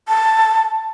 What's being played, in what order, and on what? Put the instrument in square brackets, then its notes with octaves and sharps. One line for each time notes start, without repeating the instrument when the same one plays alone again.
[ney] A5